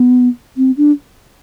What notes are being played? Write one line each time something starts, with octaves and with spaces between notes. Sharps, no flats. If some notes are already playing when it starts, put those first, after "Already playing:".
Already playing: B3
C4
D4